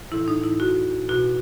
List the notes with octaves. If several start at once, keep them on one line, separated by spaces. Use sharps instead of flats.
A2 E3 E4
D#4
E4
F#4
B2 F#4